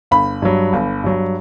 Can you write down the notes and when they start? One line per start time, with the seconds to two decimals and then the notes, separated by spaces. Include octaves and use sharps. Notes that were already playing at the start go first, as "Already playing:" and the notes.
0.11 G1 B5
0.42 G2 F#3
0.73 G1
1.04 G2 F#3